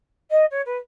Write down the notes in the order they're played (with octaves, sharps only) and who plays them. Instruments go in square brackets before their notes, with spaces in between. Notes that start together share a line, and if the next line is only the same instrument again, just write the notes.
[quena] D#5
C#5
B4